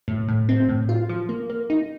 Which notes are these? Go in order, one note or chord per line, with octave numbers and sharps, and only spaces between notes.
A2
A2
C4
A2
F4
F3
A#3
A#3
D#4